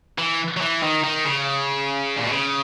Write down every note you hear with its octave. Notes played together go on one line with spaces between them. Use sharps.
E3
F#3
E3
D#3
D#3
C#3
A#2
B2
C#3